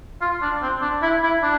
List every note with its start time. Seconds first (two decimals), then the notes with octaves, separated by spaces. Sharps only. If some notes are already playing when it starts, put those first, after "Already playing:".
0.21 F4
0.42 D4
0.62 C4
0.82 D4
1.02 E4
1.23 E4
1.43 D4